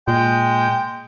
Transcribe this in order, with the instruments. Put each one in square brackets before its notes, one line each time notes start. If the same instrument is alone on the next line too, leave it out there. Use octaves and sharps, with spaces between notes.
[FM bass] A#2 [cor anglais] G#3 [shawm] G5